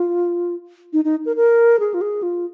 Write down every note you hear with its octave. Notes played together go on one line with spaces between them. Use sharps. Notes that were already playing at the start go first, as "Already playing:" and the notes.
Already playing: F4
D#4
D#4
A#4
A#4
G#4
F4
G#4
F4